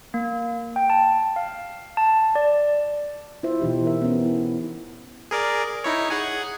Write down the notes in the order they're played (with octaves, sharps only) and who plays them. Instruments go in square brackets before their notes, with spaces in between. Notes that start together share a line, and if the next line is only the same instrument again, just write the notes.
[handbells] A#3
G5
A5
F5
A5
D5
[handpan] E4 F4 C5 E5
B2 E3 D#4 G4
A#4 E5
B3 C#4
E4
[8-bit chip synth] G#4 A#4 D5
D#4 E4 C#5
G#4 F#5 G#5